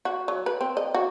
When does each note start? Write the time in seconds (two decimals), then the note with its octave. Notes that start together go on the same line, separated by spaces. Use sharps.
0.05 F#4
0.28 F#3
0.46 B4
0.61 C4
0.77 D#5
0.94 F#4